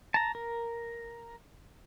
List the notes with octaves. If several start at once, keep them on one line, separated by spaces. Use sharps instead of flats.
A5 A#5
A#4